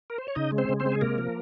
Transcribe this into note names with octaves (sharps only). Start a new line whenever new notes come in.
A#4
C5
C#5
C#3 D#4 D#5
G#3
C4 C5
C#3
C4 C5
G#3
G#4
C3 A#3 A#4
F3